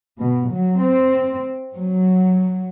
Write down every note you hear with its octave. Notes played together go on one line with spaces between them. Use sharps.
B2
F#3
C4
F#3